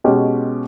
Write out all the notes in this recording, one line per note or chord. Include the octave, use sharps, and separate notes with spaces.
B2 G#3 C#4 G4